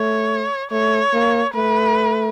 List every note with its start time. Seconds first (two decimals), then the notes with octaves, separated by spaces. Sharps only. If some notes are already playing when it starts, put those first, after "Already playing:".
Already playing: A3 C#5
0.72 A3 C#5
1.13 A#3
1.55 A3 B4